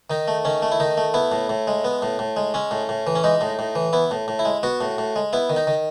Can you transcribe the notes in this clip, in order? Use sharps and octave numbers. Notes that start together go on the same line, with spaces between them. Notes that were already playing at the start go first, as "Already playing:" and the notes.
D#3 D#4
A3
D#3 C#4
A3
E4
D#3 D#4
A3
B3 E4
A2
A2
G#3
B3
A2
A2
G#3
G#3 C#4
A2
A2
E3
C#4
G#3 D#4
A2
A2
E3
B3 E4
A2
A2
E4
G#3
B3 F#4
A2
A2
G#3
B3 E4
D#3
D#4
D#3